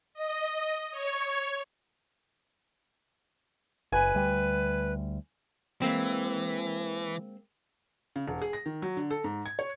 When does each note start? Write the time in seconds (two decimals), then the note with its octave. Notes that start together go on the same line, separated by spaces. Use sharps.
0.14 D#5
0.91 C#5
3.92 F#1 B4 G#5
4.15 D2 G3
5.82 E3 G#3 A#3 C4
8.16 C#3
8.28 E1
8.42 G#4
8.53 A#6
8.66 D#3
8.82 F#3
8.97 D3
9.10 A4
9.24 G#2
9.46 G#6
9.59 C#5